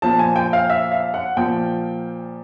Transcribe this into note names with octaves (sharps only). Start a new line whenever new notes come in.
A#2 F3 A5
G#5
G5
F5
E5
F5
F#5
A#2 F3 G5